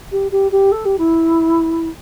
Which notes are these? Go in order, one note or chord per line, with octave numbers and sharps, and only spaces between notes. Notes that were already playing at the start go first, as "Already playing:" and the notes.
G4
G4
G4
A4
G4
E4